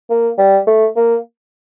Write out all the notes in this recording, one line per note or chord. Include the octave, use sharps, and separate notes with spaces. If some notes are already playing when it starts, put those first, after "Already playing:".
A#3
G3
A3
A#3